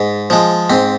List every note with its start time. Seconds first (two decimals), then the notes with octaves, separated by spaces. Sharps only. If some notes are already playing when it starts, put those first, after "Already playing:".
Already playing: G#2
0.30 F3 G#3
0.70 G#2 C4